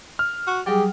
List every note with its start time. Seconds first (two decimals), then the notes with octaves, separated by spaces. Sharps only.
0.19 F6
0.47 F#4
0.66 F#3 G3 G4 G#4